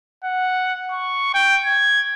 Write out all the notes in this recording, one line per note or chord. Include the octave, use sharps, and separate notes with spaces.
F#5
C#6
G5
G#6